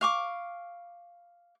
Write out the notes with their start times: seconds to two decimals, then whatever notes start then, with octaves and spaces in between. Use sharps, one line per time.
0.01 F5 C#6 D6